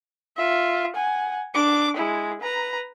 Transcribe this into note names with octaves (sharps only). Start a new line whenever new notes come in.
F4 E5
F#5 G#5
D4 D6
G#3 E4
B4 A#5